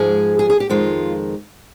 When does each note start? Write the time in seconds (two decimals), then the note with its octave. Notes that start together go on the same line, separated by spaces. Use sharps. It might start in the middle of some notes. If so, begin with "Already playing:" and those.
Already playing: G#2 F3 G#3 G#4
0.39 G#4
0.50 G#4
0.60 G4
0.69 F2 D#3 G#3 F4